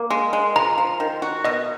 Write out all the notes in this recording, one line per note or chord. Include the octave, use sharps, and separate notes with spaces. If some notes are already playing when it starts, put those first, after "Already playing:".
Already playing: A#3
G#3
G#3
F3 A#5
F3
D#3
F#4
B2 D#5